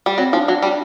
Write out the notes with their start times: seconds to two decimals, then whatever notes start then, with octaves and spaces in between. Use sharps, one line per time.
0.06 G3
0.17 F#3 C4
0.33 F3 E4
0.36 D4
0.48 F#3
0.62 G3